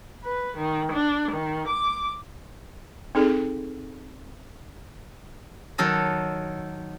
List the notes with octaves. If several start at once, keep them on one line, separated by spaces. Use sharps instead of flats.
B4
D#3
D4
D#3
D6
C4 D#4 G#4 A4
D#3 F#3 A4 D#5